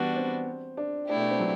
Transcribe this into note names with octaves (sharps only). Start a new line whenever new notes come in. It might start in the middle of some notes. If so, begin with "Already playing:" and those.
Already playing: E3 G3 B3 D4 F#4
C4
D4
B2 A3 D4 E4 G4
D4
C4
F#3